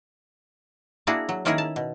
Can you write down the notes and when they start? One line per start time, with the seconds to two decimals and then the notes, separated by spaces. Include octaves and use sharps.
1.07 A#3 D4 E4 F#4 G#4
1.29 F#3
1.45 D#3 A#3 C#4 E4 G#4 A#4
1.58 A5
1.76 B2